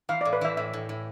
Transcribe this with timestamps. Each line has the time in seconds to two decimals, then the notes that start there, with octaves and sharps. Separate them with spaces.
0.09 E3 F5
0.21 D5
0.25 A2
0.33 B4
0.41 E3 E5
0.57 A2 E5
0.73 A2
0.89 A2